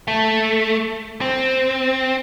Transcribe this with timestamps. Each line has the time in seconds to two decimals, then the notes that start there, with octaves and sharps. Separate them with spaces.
0.08 A3
1.21 C4